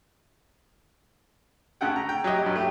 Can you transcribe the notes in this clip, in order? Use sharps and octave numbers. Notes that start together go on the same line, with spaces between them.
D2 C#3 F#5 G5
A#5
G5
F#3 G4 D#5
G2 F#3
A3 G4